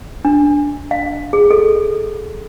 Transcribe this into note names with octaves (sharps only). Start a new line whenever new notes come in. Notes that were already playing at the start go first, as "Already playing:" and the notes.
D4
F5
G#4
A4